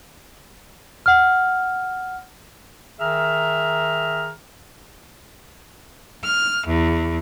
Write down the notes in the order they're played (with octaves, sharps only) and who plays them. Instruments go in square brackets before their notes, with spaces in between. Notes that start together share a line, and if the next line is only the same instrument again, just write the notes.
[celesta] F#5 F6
[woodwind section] D#3 G#4 E5 A#5 F6
[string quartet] F6
E2